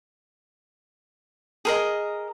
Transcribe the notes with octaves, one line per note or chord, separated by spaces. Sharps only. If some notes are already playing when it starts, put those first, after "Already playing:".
G#4 A#4 D#5